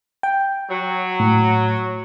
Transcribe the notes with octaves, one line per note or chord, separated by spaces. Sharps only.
G5
F#3
A2